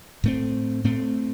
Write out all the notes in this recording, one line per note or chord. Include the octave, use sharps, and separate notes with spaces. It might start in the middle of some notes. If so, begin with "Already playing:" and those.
A2 A3 C4
A2 A3 C4